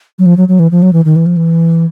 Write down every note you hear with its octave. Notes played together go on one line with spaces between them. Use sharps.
F#3
F3
F#3
F#3
E3
F3
F#3
E3
D#3
E3
F3
E3